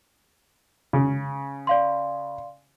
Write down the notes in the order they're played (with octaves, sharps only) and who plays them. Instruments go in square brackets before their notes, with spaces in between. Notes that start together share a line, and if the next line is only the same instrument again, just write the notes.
[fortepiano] C#3
[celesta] D5 F5 C6